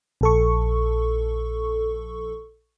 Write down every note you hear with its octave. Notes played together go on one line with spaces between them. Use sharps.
A#1 A4 C#6